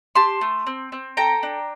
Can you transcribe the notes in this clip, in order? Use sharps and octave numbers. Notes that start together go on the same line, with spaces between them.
G4 A5 C6
A3
C4
C4
A4 G5 A#5
D4